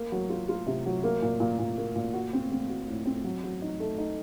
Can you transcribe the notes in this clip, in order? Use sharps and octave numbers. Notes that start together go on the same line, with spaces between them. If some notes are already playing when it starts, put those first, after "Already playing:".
Already playing: A#3
F#3
F4
F4
C3
F#3
A#3
A#2
A#2
A#2
A#3
A#2
F#4
C4
C4
F#4
A2
C4
F#3
F#3
D#4
A3
D#4